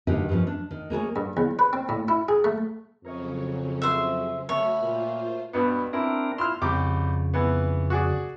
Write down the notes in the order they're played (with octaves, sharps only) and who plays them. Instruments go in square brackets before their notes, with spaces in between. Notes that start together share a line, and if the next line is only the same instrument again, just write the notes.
[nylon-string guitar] G2 A#2 D3 D#3 D#4 G4
G2 D#3 F3 C#4
D4
D#3
A#3 G#4 A#4 C#5
[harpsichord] G2
E2
B4
C4
A2
E4
G#4
A3
[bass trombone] F2 [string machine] C#3 F#3 C#4 [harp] A#4 C#5 D#5
[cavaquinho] C5 E5
[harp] A3 [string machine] F#4 B5 F6 [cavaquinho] C#5
[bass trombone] A#2 [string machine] F4 C5
[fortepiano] G2 B2 B3
[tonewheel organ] C4 D4 A#4 [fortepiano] E4
[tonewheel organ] E4 F4 [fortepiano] C6 F6
[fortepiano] C2 G4 D6 [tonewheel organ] F2 C#3
[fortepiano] E3 B3
F#4 G#4 D5